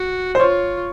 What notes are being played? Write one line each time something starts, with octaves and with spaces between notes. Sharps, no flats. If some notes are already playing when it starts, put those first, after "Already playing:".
Already playing: F#4
C5
F4 C#5